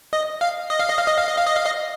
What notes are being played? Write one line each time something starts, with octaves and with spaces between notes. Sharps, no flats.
D#5
F5
D#5
F5
D#5
F5
D#5
F5
D#5
F5
D#5
F5
D#5